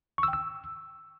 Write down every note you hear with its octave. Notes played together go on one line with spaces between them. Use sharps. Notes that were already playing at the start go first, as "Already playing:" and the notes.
C#6
E6
G5
E6